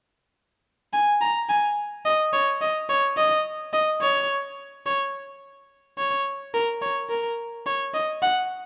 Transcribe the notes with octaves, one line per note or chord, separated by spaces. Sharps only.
G#5
A#5
G#5
D#5
C#5
D#5
C#5
D#5
D#5
C#5
C#5
C#5
A#4
C#5
A#4
C#5
D#5
F#5